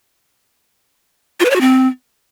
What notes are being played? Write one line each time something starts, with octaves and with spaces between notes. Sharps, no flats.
F4
B4
C#5
F#4
C4